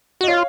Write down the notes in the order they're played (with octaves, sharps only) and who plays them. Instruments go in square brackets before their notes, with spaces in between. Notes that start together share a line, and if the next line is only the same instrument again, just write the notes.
[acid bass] F#4
[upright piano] D#5
[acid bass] F4 [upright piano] C#5 F5